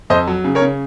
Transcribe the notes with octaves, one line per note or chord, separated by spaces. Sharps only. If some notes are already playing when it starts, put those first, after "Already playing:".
F2 C5 D#5
F#3
C#3
A#4 C#5
C#3